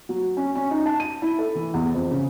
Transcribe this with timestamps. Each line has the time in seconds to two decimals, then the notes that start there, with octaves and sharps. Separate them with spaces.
0.09 F#3
0.37 C#4
0.56 C#4
0.71 D#4
0.86 A5
1.00 D#7
1.22 E4
1.39 A4
1.55 E3
1.74 E2
1.94 F2
2.11 C#3